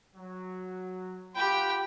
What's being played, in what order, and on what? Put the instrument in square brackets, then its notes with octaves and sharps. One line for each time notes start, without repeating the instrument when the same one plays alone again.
[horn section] F#3
[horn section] F4 F#5 B5 [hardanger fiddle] G4 G5